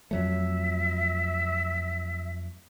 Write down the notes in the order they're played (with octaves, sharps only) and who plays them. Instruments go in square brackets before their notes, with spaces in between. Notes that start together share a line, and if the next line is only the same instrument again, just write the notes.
[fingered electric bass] F2 F#3 A3 [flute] E5